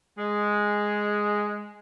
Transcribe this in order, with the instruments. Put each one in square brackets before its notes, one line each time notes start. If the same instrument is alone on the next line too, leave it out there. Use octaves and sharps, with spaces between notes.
[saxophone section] G#3